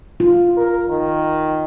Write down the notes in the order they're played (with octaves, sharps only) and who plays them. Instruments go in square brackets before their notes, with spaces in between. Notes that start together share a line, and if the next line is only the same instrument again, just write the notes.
[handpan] F4
[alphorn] A#4
D#3